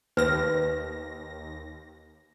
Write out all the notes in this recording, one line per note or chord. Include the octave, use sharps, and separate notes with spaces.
D#2 B4 A#6